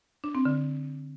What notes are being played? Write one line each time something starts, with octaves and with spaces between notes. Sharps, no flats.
D4
C4
D3